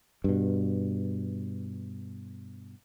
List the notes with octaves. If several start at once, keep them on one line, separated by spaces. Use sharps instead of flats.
G2 B2